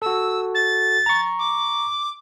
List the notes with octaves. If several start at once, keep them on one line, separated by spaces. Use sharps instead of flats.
F#4 A4 E6
A6
A#5 C#6
D6